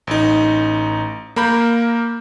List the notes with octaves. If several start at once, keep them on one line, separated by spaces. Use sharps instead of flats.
A1 D#4
A#3 A#4 B5 G6